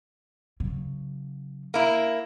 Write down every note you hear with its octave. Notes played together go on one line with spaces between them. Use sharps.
C#3 F#3
A#3 E4